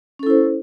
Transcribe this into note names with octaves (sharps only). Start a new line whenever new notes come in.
C#4 E4 A4 C5